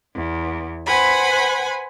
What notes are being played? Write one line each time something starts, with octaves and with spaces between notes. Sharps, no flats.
E2
B4 C5 F#5 G#5 B5